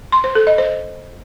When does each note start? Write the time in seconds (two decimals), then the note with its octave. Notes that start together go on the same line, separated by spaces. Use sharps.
0.12 C6
0.24 C5
0.35 A4
0.47 D#5
0.58 C5